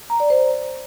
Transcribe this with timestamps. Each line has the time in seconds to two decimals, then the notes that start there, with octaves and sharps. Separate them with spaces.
0.10 A#5
0.20 D5
0.30 C5